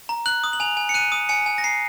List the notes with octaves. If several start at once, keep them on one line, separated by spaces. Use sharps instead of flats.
A#5
F#6 F#7
D#6
F#7
G#5 F7
G#5
C#7
F#6 D#7
D#6
G#5 C#7
G#5
A#6
A#5 C7